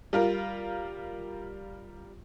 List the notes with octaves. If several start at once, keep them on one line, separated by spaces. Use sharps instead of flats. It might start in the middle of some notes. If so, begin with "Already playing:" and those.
G3 F4 A#4